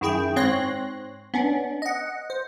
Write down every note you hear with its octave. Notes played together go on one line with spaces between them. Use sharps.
F#2 D#3 E4 G#4 G5
G#2 C4 C#5 C6 F#6 A#6
B3 C#4 D4
D#5 F#5
C5